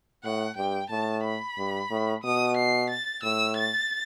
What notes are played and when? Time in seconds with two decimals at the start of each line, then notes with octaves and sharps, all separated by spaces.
0.24 A2 F#5
0.57 G2 G5
0.90 A2 A5
1.24 B5
1.58 G2
1.91 A2
2.24 B2 D#6
2.57 C7
2.90 A6
3.23 A2 E6
3.57 A6